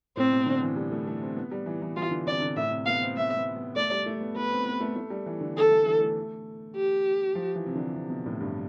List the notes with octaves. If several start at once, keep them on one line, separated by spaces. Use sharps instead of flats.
A2 C4
B2
D3
E3
G3
A3
A3
C4
B3
G3
E3
E3
E3 F4
D3
C3 D5
D3
A2 E5
C3
B3 F5
C4
B3 E5
B3
B3
A3 D5
G3
A3
B3
B3 B4
C4
B3
A3
A3
G3
E3
D3
D3 A4
E3
E3
A3
G4
F3
E3
C3
D3
C3
B2
A2
G2